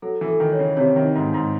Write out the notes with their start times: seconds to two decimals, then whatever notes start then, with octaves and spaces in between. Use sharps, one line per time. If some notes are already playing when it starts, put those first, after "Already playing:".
0.02 F#3 A4
0.21 E3
0.28 A4
0.40 D#3
0.52 C#5
0.59 C#3
0.77 C3 C#5
0.96 D#3
1.03 D#4
1.15 G#2
1.27 D#4
1.34 G#2